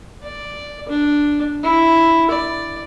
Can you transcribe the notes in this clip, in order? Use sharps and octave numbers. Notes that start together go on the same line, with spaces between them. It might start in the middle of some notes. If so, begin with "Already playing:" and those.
D5
D4
E4
D5